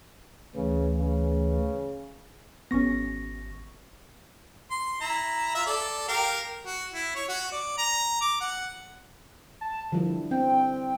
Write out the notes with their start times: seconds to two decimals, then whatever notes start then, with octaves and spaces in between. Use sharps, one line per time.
0.56 D2 C#3 E3
0.99 C#3
2.71 G#1 B3 C#4 C#6 A#6
4.71 C6
5.01 E4 A#5
5.55 F4 E5
5.66 A4 D5
6.08 G4 A#4 F5
6.65 F#4
6.93 E4
7.15 C#5
7.29 F#4
7.52 D5
7.78 A#5
8.21 D6
8.41 F#5
9.61 A5
9.92 D3 F3 G3 E4
10.31 C4 G5